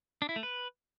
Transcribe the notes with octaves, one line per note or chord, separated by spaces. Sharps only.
D4
E4
A3
B4